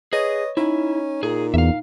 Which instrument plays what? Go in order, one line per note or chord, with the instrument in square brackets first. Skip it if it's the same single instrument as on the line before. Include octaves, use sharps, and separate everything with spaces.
[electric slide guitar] G#4 [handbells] B4 C#5 A#6 [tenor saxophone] D#5
[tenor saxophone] C#4 [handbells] D#4 [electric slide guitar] E4
[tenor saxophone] A#2 [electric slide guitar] G#4
[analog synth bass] E2 [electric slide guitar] E5 F5